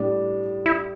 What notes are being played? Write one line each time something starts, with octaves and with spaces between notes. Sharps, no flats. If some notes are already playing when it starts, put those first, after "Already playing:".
Already playing: A2 G3 D4
E4